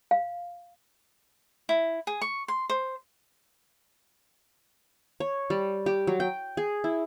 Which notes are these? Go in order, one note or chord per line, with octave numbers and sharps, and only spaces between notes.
F5
E4
G#4
C#6
C6
C5
C#5
G3
G4
F#3
G5
G#4
E4